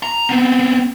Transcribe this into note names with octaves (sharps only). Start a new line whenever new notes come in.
A#5
B3 C4